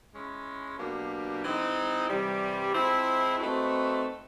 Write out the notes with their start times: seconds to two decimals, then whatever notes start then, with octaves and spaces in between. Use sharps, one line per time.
0.14 G#3 C#4 E4
0.79 B2 F#3 A#3 D4 G4
1.44 E3 G#3 C4 D#4
2.09 C3 E3 G3
2.74 F3 G#3 C4 E4
3.39 A3 C4 D#4 F#4 B4